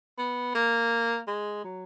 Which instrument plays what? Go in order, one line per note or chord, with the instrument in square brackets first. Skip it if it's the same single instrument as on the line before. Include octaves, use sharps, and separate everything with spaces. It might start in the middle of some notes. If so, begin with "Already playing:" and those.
[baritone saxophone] B3
A#3
G#3
F#3